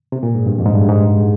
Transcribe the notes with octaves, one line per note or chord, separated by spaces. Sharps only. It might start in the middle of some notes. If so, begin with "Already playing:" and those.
C3
A#2
G#2
G2
F2
G#2
G2
G#2